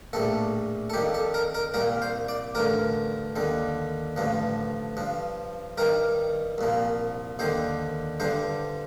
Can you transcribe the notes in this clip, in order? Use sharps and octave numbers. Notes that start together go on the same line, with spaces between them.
A#1 A2 G3 A4
A4
F2 D#3 G3 G4
A4
A#4
A#4
C2 A#2 G3 A#4
C5
D5
A1 G2 D3 A#4
D#2 D3 G3
A1 G2 D3 F3
G2 F3
G2 D#3 G3 A#4
C2 A#2 F3
D#2 D3 G3 C5
G2 D3 G3 C5